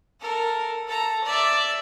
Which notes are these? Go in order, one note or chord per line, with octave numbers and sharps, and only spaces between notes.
A4 A#4
A4 A#5
D5 E5